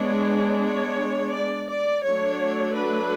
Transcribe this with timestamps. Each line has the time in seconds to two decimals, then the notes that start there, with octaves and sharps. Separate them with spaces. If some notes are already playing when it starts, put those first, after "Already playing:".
Already playing: G#3 B3 D4 C#5
0.64 C#5
1.34 D5
1.69 D5
2.04 F#3 A3 D4 C#5
2.75 B4